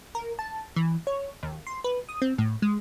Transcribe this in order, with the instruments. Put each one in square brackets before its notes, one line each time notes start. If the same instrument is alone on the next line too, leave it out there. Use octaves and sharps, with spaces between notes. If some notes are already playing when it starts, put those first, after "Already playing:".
[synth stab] A#4
A5
E3
C#5
D#2
C6
B4
D#6
C4
A2
G#3